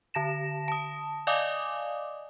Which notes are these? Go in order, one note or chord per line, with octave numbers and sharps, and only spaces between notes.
D3 A5 A#6 E7
A5 D#6
D5 D#5 F5 G#5 D6 D#6